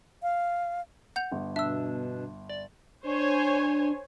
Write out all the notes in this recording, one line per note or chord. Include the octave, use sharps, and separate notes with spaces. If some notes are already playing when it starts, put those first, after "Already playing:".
F5
F#5 G6 F7
G1
B2 D4 E5 E6
D5
D4 C5 C#5 G#5